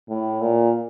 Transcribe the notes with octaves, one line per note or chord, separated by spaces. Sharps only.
A2
A#2